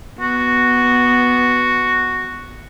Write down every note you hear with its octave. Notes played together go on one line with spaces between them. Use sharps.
B3 F#4